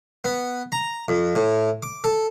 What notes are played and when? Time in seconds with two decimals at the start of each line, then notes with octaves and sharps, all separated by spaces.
0.24 B3
0.72 A#5
1.08 F2
1.35 A2
1.83 D6
2.04 A4